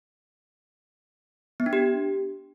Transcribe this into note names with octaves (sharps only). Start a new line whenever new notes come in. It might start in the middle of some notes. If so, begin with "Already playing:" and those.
B3
D4
G4